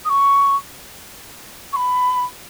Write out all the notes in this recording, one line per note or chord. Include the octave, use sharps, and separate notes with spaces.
D#6
C#6
C#6
B5